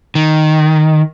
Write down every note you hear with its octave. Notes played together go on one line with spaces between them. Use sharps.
D#3